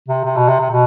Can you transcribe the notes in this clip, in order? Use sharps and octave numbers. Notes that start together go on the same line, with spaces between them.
C3
C3
B2
C3
C3
B2